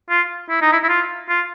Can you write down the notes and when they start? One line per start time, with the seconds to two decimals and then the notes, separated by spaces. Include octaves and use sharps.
0.10 F4
0.50 E4
0.62 D#4
0.72 E4
0.84 E4
0.89 F4
1.29 F4